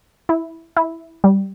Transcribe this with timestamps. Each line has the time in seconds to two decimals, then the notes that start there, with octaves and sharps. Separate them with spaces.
0.29 E4
0.77 E4
1.24 G3